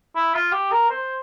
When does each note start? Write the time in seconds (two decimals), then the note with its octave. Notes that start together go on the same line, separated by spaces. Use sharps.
0.16 E4
0.34 F4
0.52 G4
0.71 A#4
0.90 C5